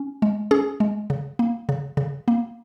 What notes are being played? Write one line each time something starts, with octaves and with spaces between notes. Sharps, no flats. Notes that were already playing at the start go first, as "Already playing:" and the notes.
Already playing: C#4
G#3
C#4 G#4
G#3
C#3
A#3
C#3
C#3
A#3